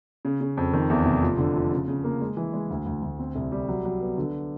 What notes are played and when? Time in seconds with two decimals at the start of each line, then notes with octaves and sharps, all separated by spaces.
0.25 C#3
0.41 C#3
0.57 F2
0.73 D#3
0.90 E2
1.06 F1
1.23 F3
1.38 D3
1.56 F3
1.72 C#3
1.88 C#3
2.04 A#3
2.21 G#3
2.37 E3
2.53 G#3
2.70 D2
2.86 D2
3.02 D2
3.19 C4
3.35 C2
3.52 G3
3.68 F#3
3.85 F#3
4.01 B3
4.18 D3